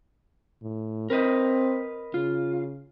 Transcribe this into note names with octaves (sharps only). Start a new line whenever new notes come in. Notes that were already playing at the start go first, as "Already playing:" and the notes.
A2
C4 A#4 B4 D#5
C#3 F4